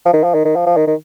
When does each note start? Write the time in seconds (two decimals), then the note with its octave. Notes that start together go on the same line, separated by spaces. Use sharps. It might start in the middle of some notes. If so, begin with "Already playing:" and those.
0.06 F3
0.13 D#3
0.23 F3
0.34 D#3
0.45 D#3
0.56 F3
0.66 F3
0.77 D#3
0.87 D#3